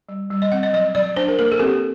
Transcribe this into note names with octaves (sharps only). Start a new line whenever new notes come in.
G3
G3
D#5
C4 F#5
D#5
F#3 D#5
F#3 D5
D4 C5
A#4
A#3 A#4
A4
C4 G4